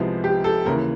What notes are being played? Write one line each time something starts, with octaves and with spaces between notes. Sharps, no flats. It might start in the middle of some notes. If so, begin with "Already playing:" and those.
Already playing: C2 C3 F3 G#3 B3
G4
A4
D#2 C#3 E3 A#4